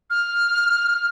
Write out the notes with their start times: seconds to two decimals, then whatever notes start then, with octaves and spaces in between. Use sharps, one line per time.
0.10 F6